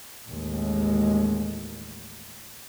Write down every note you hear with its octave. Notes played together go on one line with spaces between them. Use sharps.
A1 D#2 G#3